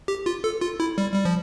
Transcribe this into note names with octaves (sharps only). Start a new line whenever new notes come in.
G4
F4
A4
F4
E4
G3
G3
F3